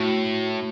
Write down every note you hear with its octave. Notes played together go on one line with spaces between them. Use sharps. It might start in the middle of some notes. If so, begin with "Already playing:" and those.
Already playing: A2 F#4